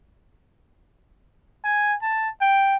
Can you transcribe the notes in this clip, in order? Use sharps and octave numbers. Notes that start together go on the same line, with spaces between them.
G#5
A5
G5